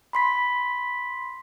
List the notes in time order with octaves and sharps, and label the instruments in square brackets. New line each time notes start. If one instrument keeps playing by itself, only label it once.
[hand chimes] B5 C6 B6